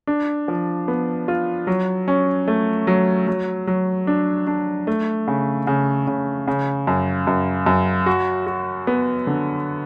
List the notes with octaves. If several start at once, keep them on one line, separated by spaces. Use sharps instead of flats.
D4
F3
B3
F4
F#3
C#4
A3
F#3
F#3
F#3
D4
D4
A3
C#3
C#3
C#3
C#3
F#2
F#2
F#2
F#4
F#4
B3
D3